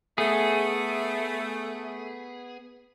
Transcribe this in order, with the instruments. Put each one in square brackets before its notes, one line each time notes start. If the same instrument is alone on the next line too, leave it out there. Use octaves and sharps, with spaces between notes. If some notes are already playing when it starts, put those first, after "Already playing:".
[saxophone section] A3 [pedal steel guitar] B3 G#4